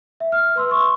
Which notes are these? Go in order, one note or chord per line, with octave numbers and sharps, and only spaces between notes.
E5
F6
B4 C6 E6
C6 C#6